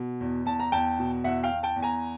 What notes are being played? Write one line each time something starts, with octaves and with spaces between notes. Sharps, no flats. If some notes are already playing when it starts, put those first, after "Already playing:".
Already playing: B2
E2
E2 A5
A#5
E2 G5 A5
B2
E2 E5 F#5
F5 G5
E2
G5 A5
E2
G#5 A#5